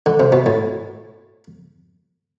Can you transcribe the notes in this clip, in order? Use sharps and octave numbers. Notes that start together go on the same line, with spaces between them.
D3
C3
B2
A2